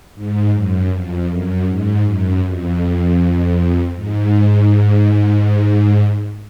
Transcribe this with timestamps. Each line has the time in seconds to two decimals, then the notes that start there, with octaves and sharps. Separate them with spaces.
0.15 G#2
0.53 F#2
0.92 F2
1.29 F#2
1.67 G#2
2.05 F#2
2.43 F2
3.95 G#2